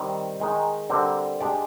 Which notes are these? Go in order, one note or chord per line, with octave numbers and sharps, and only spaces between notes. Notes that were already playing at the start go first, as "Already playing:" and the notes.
Already playing: D#3 G3 C4
D#3 G#3 D#4
D3 G3 C4 G4 A#4
G#3 D4 G4 D5